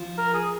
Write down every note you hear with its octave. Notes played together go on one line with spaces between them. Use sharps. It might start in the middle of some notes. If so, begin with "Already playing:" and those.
Already playing: F3
A#4
G#4